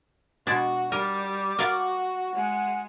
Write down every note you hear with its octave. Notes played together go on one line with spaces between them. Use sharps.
B2 G#3 D4 F#4
G3 A#4 D6
F#4 A#4 D5 F5
G#3 F#5